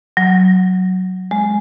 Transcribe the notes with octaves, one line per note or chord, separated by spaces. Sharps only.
F#3
G#3